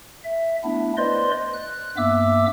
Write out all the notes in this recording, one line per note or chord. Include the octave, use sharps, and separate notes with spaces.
E5
A3 B3 D4 E4
B4 C5 D5 D#5 C6
F#6
G2 A#3 B3 E5 D6 E6